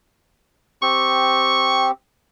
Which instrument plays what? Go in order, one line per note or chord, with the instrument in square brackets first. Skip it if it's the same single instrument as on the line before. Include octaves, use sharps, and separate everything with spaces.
[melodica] C4 G4 [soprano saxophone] C#6